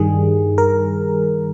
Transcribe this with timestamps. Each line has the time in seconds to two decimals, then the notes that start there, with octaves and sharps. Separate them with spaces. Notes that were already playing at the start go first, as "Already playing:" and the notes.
Already playing: G2 D#3 G3 G#4
0.58 A#4